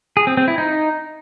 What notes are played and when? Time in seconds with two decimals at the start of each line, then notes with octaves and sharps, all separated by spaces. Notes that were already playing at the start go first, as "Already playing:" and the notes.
0.17 G#4
0.27 C4
0.37 C4
0.48 E4
0.58 D#4